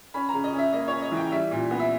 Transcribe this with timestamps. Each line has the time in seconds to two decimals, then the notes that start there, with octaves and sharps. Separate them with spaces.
0.14 C#4 B5
0.29 C#3 A#5
0.44 D#5
0.53 C#4 E5
0.73 A#3 D#5
0.87 C#4 C#5
1.02 D#5
1.12 E3 G5
1.31 G3 E5
1.51 A#2
1.71 B3
1.79 E5